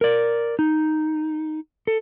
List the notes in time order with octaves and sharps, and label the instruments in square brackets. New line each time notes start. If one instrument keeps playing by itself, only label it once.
[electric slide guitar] A#4 D5
D#4
A4